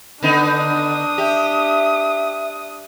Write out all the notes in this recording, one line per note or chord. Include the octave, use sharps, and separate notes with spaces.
D3 B3 D4 D#4 D#6
G4 E5